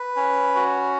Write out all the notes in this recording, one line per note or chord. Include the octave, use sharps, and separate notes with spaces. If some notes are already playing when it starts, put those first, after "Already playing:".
Already playing: B4
C#4
F#4